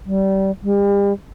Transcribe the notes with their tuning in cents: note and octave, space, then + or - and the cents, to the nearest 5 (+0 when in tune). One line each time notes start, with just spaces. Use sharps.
G3 -25
G3 +40